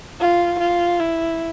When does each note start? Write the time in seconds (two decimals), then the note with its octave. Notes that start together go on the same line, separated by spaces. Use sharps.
0.20 F4
0.59 F4
1.00 E4